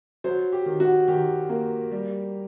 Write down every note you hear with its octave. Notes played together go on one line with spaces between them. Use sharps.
F#3 C5
G4
D#3
F#4
D#3 G4
A#3
G3